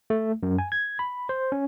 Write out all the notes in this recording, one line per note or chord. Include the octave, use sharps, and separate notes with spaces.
A3
F#2
G#5
G#6
B5
C5
C#4